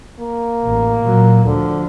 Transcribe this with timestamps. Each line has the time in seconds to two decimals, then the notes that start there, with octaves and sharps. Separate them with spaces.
0.20 A#3
0.65 A1
1.03 A#2 F#3
1.46 D2 D3 F3